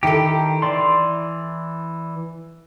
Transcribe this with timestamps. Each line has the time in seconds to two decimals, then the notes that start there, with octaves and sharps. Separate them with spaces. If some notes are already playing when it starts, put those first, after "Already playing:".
0.03 D#3 E4 G4 A4
0.62 E3 D5 C6